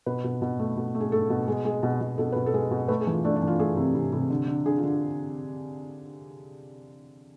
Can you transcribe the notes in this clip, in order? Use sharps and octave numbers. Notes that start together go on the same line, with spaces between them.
B2 B4
B2
B2
A3
B2
A3
G#4
A3 A4
B2
G#3
G#3
B2
B2
B2 A4
B2 B4
A4
G#3
B2
A3 B4
G#4
E3
F4
A3 D4
D4
E3
F4
A3 G#4
C3
C3
C3
D3
D3
D3 G#4
F4
D3